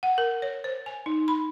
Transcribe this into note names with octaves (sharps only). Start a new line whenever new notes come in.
F#5
A#4
C#5
C5
G#5
D#4
B5